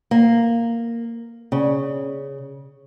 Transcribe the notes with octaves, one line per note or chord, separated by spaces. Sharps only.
A#3
C#3